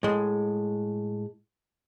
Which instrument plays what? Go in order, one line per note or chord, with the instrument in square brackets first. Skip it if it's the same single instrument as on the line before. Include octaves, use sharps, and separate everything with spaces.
[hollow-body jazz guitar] A2 G#3